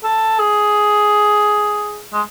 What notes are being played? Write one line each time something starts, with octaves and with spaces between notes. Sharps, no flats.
A4
G#4
G#3